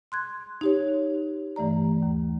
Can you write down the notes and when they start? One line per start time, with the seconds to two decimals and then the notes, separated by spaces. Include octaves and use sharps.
0.12 C6 F#6 G#6
0.61 D#4 G4 C#5
1.56 G2 E3 A3 D5 A#5
2.03 D#2